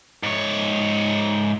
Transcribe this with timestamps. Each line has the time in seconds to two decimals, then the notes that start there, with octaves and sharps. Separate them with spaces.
0.23 G#2 C#5